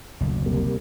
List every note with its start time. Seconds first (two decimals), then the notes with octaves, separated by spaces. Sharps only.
0.21 F#1 D2 B2
0.46 C3 G3 A#3